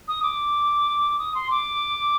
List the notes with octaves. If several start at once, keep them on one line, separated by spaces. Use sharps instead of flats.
D#6
D6
D#6
C6
D6